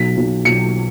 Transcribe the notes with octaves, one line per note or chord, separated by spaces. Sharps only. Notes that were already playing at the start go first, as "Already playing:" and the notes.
Already playing: B1 B6
B1
B1 C#7